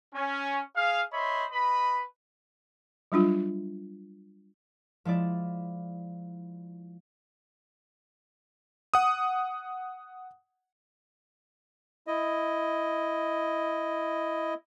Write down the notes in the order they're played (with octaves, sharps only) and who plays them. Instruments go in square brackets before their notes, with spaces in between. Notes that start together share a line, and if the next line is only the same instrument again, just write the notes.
[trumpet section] C#4
G#4 F5
C5 C#5 D#5 E5 B5
B4 D#5 B5
[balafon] F#3 G3 D4 F4
[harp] F3 G#3 E4 D5
[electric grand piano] F#5 D#6
[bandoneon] E4 D#5